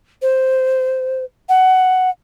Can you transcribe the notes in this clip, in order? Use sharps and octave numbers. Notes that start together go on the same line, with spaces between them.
C5
F#5